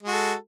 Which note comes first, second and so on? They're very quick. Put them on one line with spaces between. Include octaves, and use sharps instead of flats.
G#3 F#4 A4